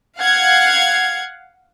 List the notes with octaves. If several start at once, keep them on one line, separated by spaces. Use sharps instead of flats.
F5 F#5 G#6